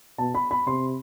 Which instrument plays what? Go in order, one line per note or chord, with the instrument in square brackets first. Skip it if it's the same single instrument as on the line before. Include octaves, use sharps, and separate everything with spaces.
[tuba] B2 [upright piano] A5
[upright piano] B5
B5
[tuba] C3 [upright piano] C6